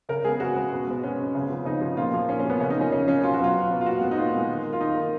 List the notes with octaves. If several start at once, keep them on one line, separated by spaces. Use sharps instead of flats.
C#3 A#4
G#3 B3 G#4
C#3 F#4
G#3 B3
B2
G#3 B3
B2 C#4
G#3 B3
C#3
F3 B3
C#3 D#4
F3 B3
A#2 F4
F3 A#3
A#2 C#4
C#4
F3 A#3 B3
C#3 C#4
D#4
A#3
F3 C#4
C#3 C#4
F3 A#3 C#4
B2 F4
F#4
F#3 B3 F4
B2
F#3 B3
F4
A#2 F#4
G#3 B3
D#4
A#2 F4
G#3 B3
D#3
A#3
F4
D#3 D#4
A#3